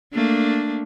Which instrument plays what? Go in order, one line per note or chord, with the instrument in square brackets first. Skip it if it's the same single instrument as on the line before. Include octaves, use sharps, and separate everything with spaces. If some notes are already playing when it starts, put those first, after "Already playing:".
[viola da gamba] A3 A#3 D4